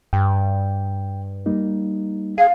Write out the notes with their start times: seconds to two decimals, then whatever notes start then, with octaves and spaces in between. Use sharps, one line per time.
0.13 G2 G5
1.46 G3 A#3 D#4
2.38 G#4 F5